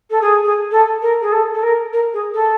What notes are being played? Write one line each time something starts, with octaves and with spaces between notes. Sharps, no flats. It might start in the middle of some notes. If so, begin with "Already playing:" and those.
A4
G#4
G#4
A4
A#4
G#4
A4
A4
A#4
A#4
G#4
A4